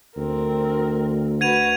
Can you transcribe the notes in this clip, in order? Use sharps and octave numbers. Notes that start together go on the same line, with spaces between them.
D2 C4 A#4
F#4 B4 G#6 D#7 F7